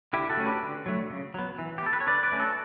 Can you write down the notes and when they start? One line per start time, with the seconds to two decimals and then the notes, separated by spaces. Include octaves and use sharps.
0.13 D3 E4 G4
0.29 F#4 A4
0.37 A3 C#4
0.46 G4 B4
0.62 D3
0.86 F#3 A3
1.10 C#3
1.34 F#3 B3
1.59 E3
1.78 G4
1.83 B3 A4
1.93 B4
2.00 C#5
2.07 D3 B4 D5
2.23 B4 D5
2.32 A3 C#4
2.39 F#4 A4